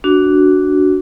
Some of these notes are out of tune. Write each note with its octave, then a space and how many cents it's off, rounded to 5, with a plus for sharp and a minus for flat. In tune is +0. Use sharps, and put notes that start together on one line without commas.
D4 -10 F#4 +5